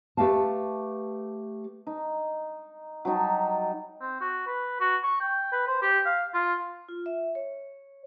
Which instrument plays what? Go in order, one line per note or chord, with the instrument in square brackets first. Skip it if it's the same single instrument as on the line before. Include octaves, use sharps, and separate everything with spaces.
[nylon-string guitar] A3 G4 B4 F5 A5
[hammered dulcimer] D#4
F#3 G3 D#4 A5
[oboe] C4
F#4
B4
F#4
C#6
G5
B4
C5
G4
F5
F4
[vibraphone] F4
E5
C#5